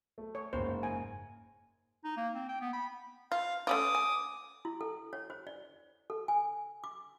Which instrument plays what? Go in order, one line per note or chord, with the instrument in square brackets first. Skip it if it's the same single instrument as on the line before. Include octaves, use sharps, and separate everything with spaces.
[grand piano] A3
[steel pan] C#5
[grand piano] F#1 G#2 [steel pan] C5
[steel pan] G#5
[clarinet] D#4
A#3
C4
G5
B3
B5
[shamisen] F4 [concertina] F5
[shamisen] A3 C#4 F4 [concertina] D6 D#6
[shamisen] G#5
[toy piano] E4
A4
C#5
C5
D5
A4
G#5
D6